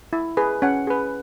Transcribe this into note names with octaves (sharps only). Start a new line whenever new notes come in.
E4
G#4 B4
C#4 F#5
G#4 B4